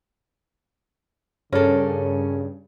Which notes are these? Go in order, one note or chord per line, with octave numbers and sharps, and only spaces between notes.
G2 C#3 C#4 A4 A#4